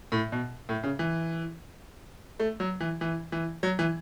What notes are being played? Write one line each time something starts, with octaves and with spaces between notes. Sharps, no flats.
A2
B2
A2
C#3
E3
A3
F#3
E3
E3
E3
F#3
E3